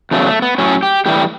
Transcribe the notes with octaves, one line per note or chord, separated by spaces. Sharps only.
E2 C#3 F#3 A3
A3
B3
A2 F#3 C#4
G4
A2 E3 G3 G4